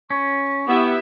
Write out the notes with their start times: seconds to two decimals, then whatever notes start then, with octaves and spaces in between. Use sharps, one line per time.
0.10 C#4 C#6
0.67 B3 E4 G4 E5